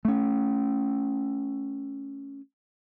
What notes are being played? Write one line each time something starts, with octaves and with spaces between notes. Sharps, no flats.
A3 C#4